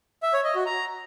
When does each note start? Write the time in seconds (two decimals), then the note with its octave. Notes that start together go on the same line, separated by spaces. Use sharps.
0.23 E5
0.33 C#5
0.44 D#5
0.55 F#4
0.66 A#5